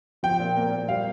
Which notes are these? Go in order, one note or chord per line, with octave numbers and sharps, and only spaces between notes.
F3 G5
A#2
A#3
A#2
G3 F5